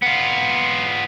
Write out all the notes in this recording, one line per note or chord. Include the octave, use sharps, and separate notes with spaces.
B3 F4